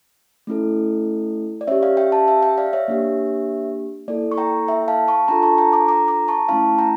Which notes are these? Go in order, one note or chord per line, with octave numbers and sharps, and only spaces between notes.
A3 C#4 E4 A4
D5
C#4 G4 C#5 E5
D5 F5
E5 G5
F5 A5
E5 G5
E5 G5
D5 F5
C#5 E5
A#3 D4 G4
A#3 E4 A4 D5
C#6
G5 A#5
E5 G5
F5 A5
A5 C#6
D4 F4 A4 G5 A#5
A5 C#6
G5 A#5
A#5 D6
A#5 D6
A#5 D6
A5 C#6
A3 C#4 E4 F5 A5
G5 A#5